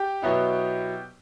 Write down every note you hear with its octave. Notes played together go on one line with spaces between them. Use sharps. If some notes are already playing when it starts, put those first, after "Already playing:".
Already playing: G4 G5
B2 F#3 B3 E4